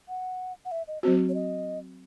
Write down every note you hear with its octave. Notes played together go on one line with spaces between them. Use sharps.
F#5
F#5
E5
D#5
F#3 C4 F#4 C5
C#5
D#5